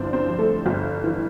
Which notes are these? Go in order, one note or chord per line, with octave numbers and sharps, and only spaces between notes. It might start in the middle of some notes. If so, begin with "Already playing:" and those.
Already playing: G1 E3 F3 C4 D4 C5 D5
C4 C5
F2
A3 A4
G1
E3